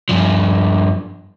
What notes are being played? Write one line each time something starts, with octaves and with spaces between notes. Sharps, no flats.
G2 F3